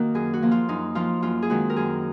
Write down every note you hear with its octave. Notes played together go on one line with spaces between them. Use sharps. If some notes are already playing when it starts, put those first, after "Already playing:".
Already playing: D#3 A#3 F#4 A#4
F#2 G#4
F#4
F3 A#3
F4
F#2 D#4
F3 A#3 F4
F#2 F4
G#4
D#3 G#3 C4 F#4
A#4
F#2 G#4